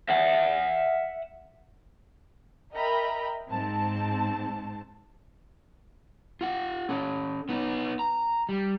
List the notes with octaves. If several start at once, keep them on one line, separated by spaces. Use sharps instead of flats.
E5 F#5
A#4 D#5 E5 G5 A#5 B5
G#2 C4 A5
F4 F#5
C#4 A4
B3 D#4
A#5
G3